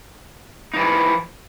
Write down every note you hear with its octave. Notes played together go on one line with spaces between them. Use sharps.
E3 F3 D#4